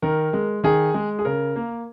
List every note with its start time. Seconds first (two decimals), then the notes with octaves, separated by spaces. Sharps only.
0.02 D#3 A#4
0.33 G#3
0.64 D#3 G#4
0.94 G#3
1.19 G#4
1.25 C#3 A#4
1.56 A#3